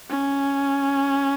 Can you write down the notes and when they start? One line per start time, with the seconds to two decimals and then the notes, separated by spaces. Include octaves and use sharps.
0.10 C#4